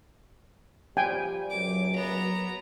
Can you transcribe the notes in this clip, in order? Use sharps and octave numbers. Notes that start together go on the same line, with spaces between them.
F3 G3 G5 G#5
C#2 F#2 A#2 F#3 D6
B3 A#5